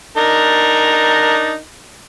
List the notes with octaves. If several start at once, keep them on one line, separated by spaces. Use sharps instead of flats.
D4 D#4 A#4